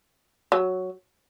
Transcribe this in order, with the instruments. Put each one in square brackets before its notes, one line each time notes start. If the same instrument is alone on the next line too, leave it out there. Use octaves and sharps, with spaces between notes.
[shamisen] F#3